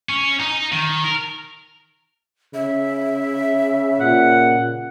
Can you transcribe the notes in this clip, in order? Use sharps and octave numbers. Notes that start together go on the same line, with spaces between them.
C#4
D#4
D#3
A#4
C#3 E5
A#2 F#5